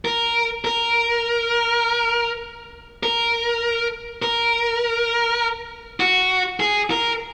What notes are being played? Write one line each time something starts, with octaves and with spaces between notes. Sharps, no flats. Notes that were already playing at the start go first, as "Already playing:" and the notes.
A#4
A#4
A#4
A#4
F#4
G#4
A#4